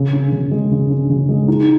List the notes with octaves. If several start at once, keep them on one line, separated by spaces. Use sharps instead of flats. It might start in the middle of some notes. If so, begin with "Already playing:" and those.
Already playing: C#3
C#4
C#3
G#3
C#3
C#4
C#3
G#3
D#4